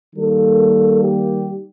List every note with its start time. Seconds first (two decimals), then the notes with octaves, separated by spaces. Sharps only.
0.15 D#3 G3 A#3 A4
1.01 G4